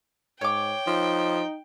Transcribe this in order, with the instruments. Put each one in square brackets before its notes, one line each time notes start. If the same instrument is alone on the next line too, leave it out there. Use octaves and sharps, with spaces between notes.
[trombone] G#2 [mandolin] C#5 D6 [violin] G5
[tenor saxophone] F3 [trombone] D#4